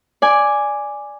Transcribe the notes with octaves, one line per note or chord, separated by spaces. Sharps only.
D5 G#5